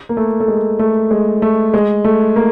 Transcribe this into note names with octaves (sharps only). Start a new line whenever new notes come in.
A#3
A3
A3
G#3
A3
G#3
A3
G#3
A3
A#3